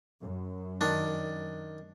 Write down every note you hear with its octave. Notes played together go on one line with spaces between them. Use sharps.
F#2
D#3 D4